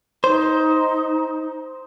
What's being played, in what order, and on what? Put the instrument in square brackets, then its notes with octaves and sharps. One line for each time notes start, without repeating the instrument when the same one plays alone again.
[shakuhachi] D#4 [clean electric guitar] C5